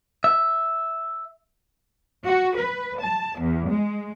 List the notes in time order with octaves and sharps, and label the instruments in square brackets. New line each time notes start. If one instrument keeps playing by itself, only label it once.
[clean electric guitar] E5
[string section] F#4
B4
A5
E2
G#3